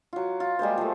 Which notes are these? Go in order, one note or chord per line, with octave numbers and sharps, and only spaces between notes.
F#3 F4
F4
G3 G#3 A#3 C5
F3 A3